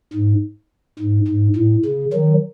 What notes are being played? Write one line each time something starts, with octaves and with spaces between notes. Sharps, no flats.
G#2
G#2
G#2
A2
C#3
D#3 F#3